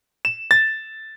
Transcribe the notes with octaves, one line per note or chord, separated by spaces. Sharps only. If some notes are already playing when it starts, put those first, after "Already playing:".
E7
A6